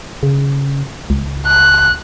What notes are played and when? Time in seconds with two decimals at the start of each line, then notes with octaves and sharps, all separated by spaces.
0.23 C#3
1.10 C#2
1.46 F#6